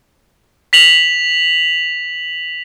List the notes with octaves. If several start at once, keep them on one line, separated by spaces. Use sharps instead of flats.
B6 F7 F#7